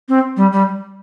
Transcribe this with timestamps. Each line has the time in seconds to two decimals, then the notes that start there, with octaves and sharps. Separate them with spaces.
0.09 C4
0.37 G3
0.52 G3